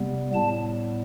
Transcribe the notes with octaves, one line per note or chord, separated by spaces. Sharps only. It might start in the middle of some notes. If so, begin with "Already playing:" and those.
Already playing: C3 G3 B3
A2 G3 B3 A5